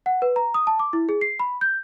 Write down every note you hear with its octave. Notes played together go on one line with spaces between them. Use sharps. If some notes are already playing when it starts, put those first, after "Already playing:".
F#5
B4
A#5
D#6
A5
D6
E4
G#4
C7
B5
G6